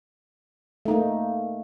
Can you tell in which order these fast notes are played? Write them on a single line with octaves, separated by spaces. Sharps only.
A3 D#4 A#3